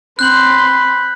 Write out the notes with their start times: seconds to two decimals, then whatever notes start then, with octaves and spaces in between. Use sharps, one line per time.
0.19 C4 B5 C6 F#6 G6 F#7